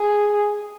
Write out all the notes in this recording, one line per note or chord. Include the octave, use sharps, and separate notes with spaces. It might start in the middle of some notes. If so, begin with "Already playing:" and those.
Already playing: G#4